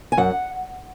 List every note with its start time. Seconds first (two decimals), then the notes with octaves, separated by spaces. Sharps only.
0.12 G#5
0.17 F#2 F#5